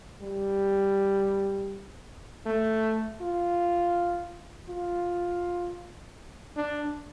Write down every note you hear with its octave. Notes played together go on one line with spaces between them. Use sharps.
G3
A3
F4
F4
D4